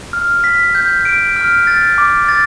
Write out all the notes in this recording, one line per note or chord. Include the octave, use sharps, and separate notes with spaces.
F6
B6
G6
D7
F6
A6
D6
A6